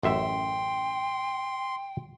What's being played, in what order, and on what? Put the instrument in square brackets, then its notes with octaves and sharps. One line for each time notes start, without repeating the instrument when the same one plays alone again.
[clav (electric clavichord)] A1 F#2 E5 [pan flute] G5 [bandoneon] C6